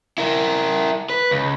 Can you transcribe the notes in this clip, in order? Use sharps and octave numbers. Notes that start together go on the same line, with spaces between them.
E4 A#4
B4
C#2